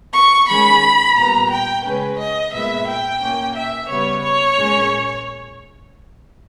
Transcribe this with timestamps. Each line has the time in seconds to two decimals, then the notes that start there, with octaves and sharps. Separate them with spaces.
0.13 C#6
0.47 D#3 G#3 C#4 B5
1.16 A#2 G3 B3 A#5
1.50 G5
1.84 C#3 G#3 C#4 B4
2.18 D#5
2.52 A#2 G#3 B3 E5
2.86 G5
3.20 A#2 A#3 C#4
3.54 E5
3.88 C#3 G3 B3 C#5
4.22 C#5
4.57 A#2 G#3 C#4